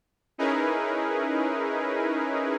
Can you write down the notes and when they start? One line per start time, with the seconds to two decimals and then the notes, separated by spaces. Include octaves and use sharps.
0.38 C#4 D#4 E4 G#4 A#4 B4